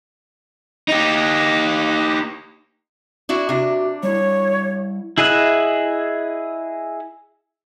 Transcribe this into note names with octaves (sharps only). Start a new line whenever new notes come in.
D#4 G4
D4 E4 F#4
C3 D4 F#4 G4 E5
G3 E4 C#5
E4 G#4 D#5 E5 F#5